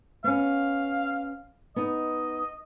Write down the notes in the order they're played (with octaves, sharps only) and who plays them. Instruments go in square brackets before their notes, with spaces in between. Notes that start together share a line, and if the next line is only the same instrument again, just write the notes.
[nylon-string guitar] B3 C#4 [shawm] F5
[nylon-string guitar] B3 D#4 [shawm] D#5